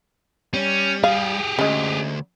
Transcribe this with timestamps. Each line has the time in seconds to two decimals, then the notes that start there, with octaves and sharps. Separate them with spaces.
0.54 G3 C#4
1.04 G4 G#4 F5
1.59 D2 G#3 C#4